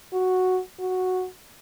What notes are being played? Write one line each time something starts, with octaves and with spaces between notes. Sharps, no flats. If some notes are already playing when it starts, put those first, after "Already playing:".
F#4
F#4